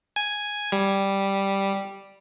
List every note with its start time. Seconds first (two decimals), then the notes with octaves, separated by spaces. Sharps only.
0.16 G#5
0.72 G3